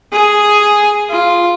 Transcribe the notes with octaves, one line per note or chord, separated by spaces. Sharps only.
G#4
F4